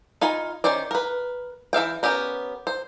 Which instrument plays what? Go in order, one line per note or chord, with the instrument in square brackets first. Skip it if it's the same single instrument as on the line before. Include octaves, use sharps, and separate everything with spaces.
[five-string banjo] D#4 F4 G#5 B5
D#3 C#4 C5 D5
A#4 B4
E3 E5 F5 G5
B3 C#4 G4 A#4
C5